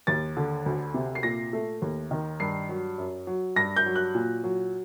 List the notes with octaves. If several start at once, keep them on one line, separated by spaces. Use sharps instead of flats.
D#2 A6
D3
D2
C3
C7
A#2 A#6
A3
D#2
D#3
G2 C7
F#3
F#2
F#3
G2 A#6
G6
F#3
F#6
A#2
F#3